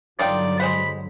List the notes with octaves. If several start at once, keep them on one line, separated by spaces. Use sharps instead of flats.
G2 D3 F#3 D#4 F4 D5 G5
G#3 C5 F#5 B5